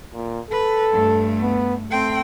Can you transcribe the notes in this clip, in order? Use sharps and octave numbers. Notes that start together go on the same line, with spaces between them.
A#2
A4 B4
G2 A3
B3
A3 C4 G5